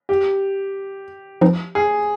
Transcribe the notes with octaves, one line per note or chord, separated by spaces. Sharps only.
G4
F3 C4 D#4 B4
G#4